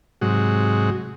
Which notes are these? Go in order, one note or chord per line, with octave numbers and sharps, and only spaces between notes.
G#2 C3 F#3 G#3 F#4